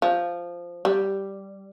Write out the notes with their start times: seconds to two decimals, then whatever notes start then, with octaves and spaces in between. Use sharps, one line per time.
0.02 F3
0.85 G3